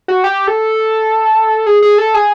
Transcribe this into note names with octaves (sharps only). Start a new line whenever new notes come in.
F#4
G4
A4
G#4
G#4
A4
G#4